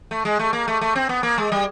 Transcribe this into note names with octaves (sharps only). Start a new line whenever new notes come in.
A3
G#3
A3
A#3
A3
A3
C4
B3
A#3
G#3
G3